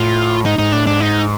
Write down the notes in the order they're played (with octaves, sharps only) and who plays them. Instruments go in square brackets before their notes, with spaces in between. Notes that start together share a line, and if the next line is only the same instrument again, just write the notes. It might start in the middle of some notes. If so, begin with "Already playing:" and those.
Already playing: [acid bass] A2 [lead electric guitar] F4
[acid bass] G#2 [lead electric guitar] D#4
[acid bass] G#2 [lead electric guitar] D#4
[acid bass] A2 [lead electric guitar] D4
[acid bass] G#2 [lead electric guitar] D4
[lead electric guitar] D#4